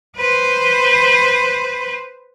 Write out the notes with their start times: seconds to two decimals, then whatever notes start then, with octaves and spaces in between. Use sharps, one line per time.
0.16 B4 C5